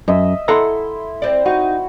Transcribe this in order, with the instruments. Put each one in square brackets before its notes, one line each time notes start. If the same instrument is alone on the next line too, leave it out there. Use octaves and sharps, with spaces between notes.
[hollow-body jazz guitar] F#2 [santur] D#5 E5
[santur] E4 C6 [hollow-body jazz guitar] A4 F#5 A#5
[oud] C4 D5
[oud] D#4 [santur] F#4